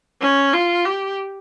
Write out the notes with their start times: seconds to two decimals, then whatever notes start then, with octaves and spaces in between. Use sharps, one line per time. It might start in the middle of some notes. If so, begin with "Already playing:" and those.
0.21 C#4
0.53 F4
0.85 G4